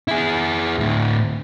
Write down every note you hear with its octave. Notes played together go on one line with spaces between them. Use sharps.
E4 G#4
D2 A2